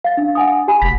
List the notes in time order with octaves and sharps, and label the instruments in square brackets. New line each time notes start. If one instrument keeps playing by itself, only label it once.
[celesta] F5 A6
D4
F#5 G#5 D#6
G4 G#5 B5
[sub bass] F1 [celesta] B6